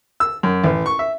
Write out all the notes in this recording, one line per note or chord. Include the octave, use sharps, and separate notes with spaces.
E6
F#2
A1
C#6
E5